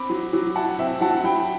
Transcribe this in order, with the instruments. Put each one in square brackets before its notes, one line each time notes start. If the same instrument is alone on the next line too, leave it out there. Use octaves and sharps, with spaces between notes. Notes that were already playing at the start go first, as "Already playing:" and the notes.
Already playing: [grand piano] C4 B5 D6
F#3
F#3
E4 F#5 A5
C4 E5 G5
F#3 F#5 A5
F#3 G5 B5